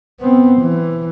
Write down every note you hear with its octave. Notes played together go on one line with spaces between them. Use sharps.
B3 C4
E3